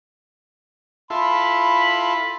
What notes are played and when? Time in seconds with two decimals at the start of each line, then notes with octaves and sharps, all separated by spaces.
1.10 E4 F4 A4 B5